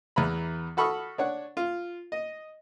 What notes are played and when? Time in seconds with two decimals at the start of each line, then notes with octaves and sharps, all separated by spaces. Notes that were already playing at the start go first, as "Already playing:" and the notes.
0.16 E2 E3 A#5 B5
0.77 F#4 A4 B5 C#6 D#6 F6
1.18 D4 C#5 F#5
1.57 F4
2.12 D#5